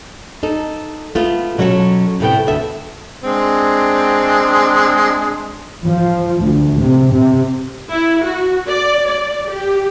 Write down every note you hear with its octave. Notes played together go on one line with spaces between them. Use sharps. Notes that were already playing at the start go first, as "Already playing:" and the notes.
D#4 A4
A3 B3 F4
B2 F#3 C#4 F#4 A4
A2 C3 A3 B3 A4 G5
D2 B3 A4 E5
G#3 C4 D4
F3
D2
C3
C3
E4
F#4
D5
D5
G4